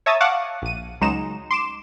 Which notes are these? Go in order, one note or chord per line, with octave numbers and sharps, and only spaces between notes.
C#5 E5 A5 A#5 D#6 A6
F5 F#5 A5 C#6 D6 F#6
A#1 D#7
C#2 F#3 G#3 D#4 A#5 E7
C6 D6 E7